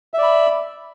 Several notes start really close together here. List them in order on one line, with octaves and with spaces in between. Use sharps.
E5 D5 B5